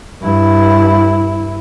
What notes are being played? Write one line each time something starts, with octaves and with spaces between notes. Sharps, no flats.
G2 E4